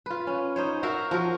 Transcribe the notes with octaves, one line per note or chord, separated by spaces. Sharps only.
F4 B4
C#4
D#4 C5 C#5
F#4 A#4 E5 F5
F3 F#4 A#4